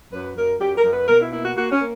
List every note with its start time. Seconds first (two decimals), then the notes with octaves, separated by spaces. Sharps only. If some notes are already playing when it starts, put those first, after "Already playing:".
0.13 F#2 B4
0.36 F#2 A#4
0.60 F#2 G4
0.77 A#4
0.84 F#2
0.92 B4
1.08 B2 A#4
1.20 E4
1.32 A#3 E4
1.44 F#4
1.56 A#3 F#4
1.71 C#4
1.80 A#3